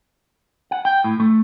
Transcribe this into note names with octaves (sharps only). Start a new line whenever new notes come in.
F#5
G5
A2
A3